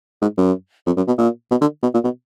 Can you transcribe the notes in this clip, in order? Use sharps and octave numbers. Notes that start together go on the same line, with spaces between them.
G#2
F#2
F2
F#2
B2
A#2
B2
D3
B2
A#2
B2